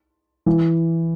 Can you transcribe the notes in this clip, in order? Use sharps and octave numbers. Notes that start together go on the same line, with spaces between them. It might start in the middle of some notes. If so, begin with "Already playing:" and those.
E3